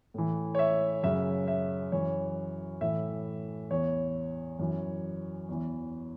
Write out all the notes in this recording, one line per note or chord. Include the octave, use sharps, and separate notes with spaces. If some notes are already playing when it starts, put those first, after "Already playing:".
A2 E3
C#5
E5
F#2 C#3 F#3 E5
E5
F#2 E3 C#5
A2 E3 E5
E2 E3 C#5
F#2 E3
E2 E3